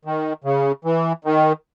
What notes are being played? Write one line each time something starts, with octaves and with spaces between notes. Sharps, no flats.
D#3
C#3
E3
D#3